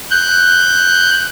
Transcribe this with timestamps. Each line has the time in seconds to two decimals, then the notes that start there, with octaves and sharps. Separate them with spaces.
0.10 F#6 G6